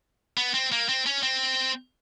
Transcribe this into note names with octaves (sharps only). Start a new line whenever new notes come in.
B3
C4
A#3
C4
C#4
C4